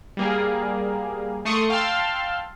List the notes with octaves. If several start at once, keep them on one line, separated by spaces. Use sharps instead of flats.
G3 A#3 G#4
A3 C6 C#6 D#6 C#7
F5 G5 A5 C6 E6